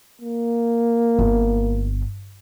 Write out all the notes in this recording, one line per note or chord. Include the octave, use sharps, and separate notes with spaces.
A#3
G1